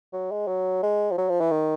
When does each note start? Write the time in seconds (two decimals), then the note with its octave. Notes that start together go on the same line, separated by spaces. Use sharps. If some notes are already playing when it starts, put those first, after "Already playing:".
0.13 F#3
0.31 G#3
0.47 F#3
0.83 G#3
1.11 F3
1.18 F#3
1.29 F3
1.40 E3
1.51 D#3